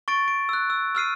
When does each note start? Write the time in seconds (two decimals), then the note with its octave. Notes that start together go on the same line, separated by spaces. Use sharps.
0.08 C#6 A6 D7
0.28 D7
0.49 E6 F#6
0.70 E6
0.95 E6 F6 C7 D#7